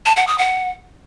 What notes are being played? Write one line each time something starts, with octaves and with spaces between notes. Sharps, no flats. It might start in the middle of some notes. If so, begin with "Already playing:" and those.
A5
F#5
D#6
F#5